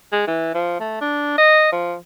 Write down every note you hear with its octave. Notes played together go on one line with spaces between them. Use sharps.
G#3
E3
F3
A3
D4
D#5
F3